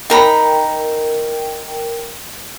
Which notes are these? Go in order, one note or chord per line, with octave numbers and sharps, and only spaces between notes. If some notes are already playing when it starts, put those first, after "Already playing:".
D#4 A#4 G5 A#5 B5